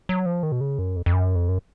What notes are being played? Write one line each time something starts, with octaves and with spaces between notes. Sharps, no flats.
F#3
F3
D#3
B2
C#3
F#2
F2
F2
F#2
F2
F#2